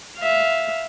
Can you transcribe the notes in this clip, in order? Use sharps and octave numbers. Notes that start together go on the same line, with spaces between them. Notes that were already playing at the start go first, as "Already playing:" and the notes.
E5 F5